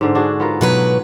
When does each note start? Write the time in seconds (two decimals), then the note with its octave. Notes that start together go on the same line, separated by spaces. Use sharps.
0.01 G#2 D3 C5
0.15 D4 F#4 G#4
0.40 B3 F4 A#4
0.61 B2 F#3 B4